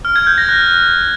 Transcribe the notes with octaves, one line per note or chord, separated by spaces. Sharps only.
F6
G#6
G6
A#6
F#6